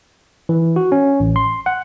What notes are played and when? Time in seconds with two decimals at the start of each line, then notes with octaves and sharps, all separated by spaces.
0.49 E3
0.76 F#4
0.92 C#4
1.20 A1
1.36 C6
1.66 F#5